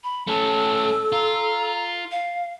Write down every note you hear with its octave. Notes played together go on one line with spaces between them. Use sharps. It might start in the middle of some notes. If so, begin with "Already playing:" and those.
B5
A3 C#4 A4 A5
F4 A#5
F5